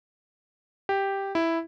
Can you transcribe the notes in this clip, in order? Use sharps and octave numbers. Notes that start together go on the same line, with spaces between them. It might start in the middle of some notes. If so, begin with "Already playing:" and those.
G4
E4